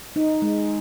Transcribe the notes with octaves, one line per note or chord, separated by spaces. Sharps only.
D#4
G#3